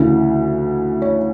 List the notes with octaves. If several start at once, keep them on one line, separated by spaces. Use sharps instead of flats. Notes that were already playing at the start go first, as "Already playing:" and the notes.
Already playing: D2 C#3 E3
C#5